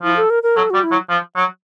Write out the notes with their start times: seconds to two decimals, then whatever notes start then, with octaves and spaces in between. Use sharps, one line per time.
0.03 F3 E4
0.16 A4
0.30 A#4
0.43 A#4
0.56 F#3 A4
0.70 G3 F#4
0.83 E4
0.92 F#3
1.10 F3
1.36 F#3